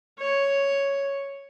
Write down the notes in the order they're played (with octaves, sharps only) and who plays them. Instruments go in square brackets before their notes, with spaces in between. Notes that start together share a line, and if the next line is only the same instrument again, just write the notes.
[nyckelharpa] C#5